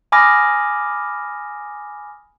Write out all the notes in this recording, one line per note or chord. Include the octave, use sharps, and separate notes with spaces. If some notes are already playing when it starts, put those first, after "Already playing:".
G#5 B5 D6 D#6 F6 A#6